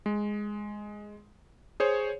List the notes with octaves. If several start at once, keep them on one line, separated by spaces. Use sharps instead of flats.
G#3
G#4 C5 C#5